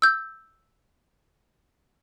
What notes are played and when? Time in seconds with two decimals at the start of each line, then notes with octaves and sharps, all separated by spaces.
0.02 E6 G6